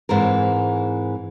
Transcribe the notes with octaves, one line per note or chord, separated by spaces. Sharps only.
G#2 E3 C4 A#4